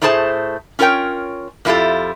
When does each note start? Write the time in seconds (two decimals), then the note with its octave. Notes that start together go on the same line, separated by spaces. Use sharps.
0.02 A2 A3 D4 G#4 C5 A5
0.79 C#4 F4 A#4 C#5 G5
1.65 F2 A#3 E4 F4 G4 A4